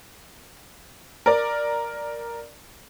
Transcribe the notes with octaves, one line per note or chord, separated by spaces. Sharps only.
A#4 D5